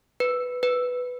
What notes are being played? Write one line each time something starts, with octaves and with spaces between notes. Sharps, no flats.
B4
B4